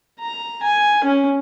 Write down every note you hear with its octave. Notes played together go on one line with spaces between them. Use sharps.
A#5
G#5
C#4